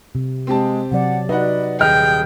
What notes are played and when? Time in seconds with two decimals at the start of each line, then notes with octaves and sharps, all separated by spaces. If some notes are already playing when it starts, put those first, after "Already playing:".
0.15 C3
0.47 G#3 C4 G4 A5
0.92 C3 F#3 D5 F#5
1.29 D#4 F#4 B4 D5 F#5
1.80 D#1 G#4 D#5 G5 F6